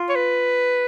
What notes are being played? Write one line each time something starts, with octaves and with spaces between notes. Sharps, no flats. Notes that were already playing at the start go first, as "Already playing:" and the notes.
Already playing: F4
C#5
B4